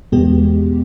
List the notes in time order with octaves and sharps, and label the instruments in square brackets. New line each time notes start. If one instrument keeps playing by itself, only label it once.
[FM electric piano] E2 B2 G#3 B3 G4